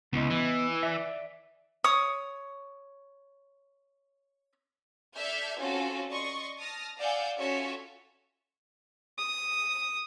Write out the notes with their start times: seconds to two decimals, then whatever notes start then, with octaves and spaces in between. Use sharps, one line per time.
0.13 C#2 B3 E4 D#5
0.30 E3
0.83 D5 E5
1.84 C#5 D#6
5.16 A4 D5 E5 F6 G6 G#6
5.58 C4 C#4 F4 F#4 A4
6.10 D5 D#5 C6 C#6
6.58 A5 D#6 F6 A#6
6.99 D5 F5 F#5 G#5 E6 G6
7.37 C#4 F4 F#4 A4 C#5 E5
9.18 D#6